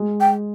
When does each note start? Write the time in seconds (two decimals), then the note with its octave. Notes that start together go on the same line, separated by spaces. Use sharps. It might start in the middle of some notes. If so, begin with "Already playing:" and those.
Already playing: G#3
0.21 G5